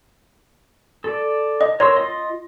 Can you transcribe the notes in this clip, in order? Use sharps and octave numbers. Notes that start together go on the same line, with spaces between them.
A4 D5
D#5
A#4 C#5 C6 E6
F4 D#5